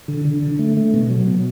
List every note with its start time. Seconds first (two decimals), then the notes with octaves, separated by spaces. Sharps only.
0.08 D3
0.25 D3
0.42 D3
0.59 A3
0.77 A3
0.94 B2
1.10 F#3
1.27 B2